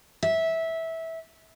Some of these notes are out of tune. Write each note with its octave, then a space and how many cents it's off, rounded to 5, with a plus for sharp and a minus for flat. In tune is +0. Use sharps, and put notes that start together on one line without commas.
E5 -15